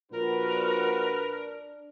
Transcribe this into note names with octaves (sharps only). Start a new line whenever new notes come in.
A#2 F3 D4 F#4 A#4 B4